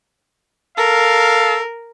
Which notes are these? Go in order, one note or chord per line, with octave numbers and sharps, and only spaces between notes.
A4 A#4 F5